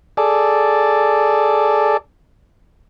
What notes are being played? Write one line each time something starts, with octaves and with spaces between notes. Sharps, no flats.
G#4 A4 D5